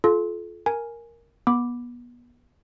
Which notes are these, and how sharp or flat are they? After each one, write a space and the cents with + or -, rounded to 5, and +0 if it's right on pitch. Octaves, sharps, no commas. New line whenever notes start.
F4 +0 A4 -35
A#4 +0 G#5 +0
B3 -30 B5 +0 D6 +0